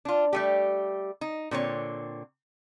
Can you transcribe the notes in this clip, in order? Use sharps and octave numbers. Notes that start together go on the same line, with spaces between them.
D4 F4
G3 A3 G4
D#4
A#2 D3 C4 C#5